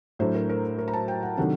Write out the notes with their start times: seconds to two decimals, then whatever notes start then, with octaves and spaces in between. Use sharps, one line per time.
0.19 A2 F#3 A3 D4 C5
0.35 A#4
0.49 A#4
0.78 A#4
0.88 A#5
0.93 A5
1.08 G5
1.23 F#5
1.38 C3 D#3 F#3 A3 D4 F#5